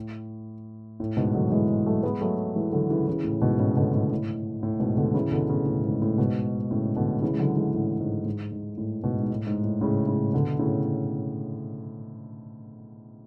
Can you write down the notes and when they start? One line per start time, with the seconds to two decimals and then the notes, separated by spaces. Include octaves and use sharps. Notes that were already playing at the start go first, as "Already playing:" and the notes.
Already playing: A2
1.00 A2
1.17 G#2 B2
1.34 D3 F#3
1.51 E3 G#3
1.86 F#3 A3
2.03 G#3 B3
2.21 F#3 A3
2.55 E3 G#3
2.72 D3 F#3
2.90 C#3 E3
3.07 C#3 E3
3.24 A2
3.42 G#2 B2
3.59 A2 C#3
3.76 B2 D3
3.93 A2
4.10 A2
4.63 A2
4.80 G#2 B2
4.97 B2 D3
5.14 C#3 E3
5.32 B2 D3
5.49 A2 C#3
5.66 A2
5.84 G#2
6.02 A2
6.18 G#2 B2
6.71 A2 C#3
6.96 B2 D3
7.22 C#3 E3
7.34 G#3
7.39 D3 F#3
7.57 E3 G#3
7.74 A2
8.00 G#2
8.26 G#2
8.52 G#2
8.78 A2
9.03 G#2 B2
9.19 G#2
9.29 A2
9.47 G#2
9.64 A2
9.81 A2 C#3
10.07 A2 C#3
10.33 B2 D3
10.59 A2 C#3